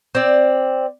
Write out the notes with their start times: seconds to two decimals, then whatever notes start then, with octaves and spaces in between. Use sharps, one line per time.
0.15 C4 D5